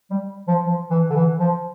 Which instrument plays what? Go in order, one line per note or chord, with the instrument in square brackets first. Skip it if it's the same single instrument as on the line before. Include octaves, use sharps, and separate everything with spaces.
[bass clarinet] G3
F3
F3
E3
D3
E3
F3